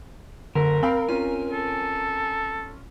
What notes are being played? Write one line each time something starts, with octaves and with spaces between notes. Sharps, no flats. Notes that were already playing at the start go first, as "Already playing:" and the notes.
F#1 D3 A#4
C4 F5 G5 B5
C4 C#4 F4 G#5
A4